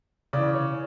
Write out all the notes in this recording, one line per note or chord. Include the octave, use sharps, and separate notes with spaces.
C#3 E3 D5
C#5